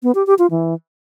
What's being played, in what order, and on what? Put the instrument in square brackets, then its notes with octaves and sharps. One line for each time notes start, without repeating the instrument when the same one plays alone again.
[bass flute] B3
G4
G4
F4
E3